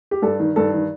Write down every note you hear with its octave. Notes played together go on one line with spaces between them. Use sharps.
G4
G2 A4
D#3
G2 A4
D#3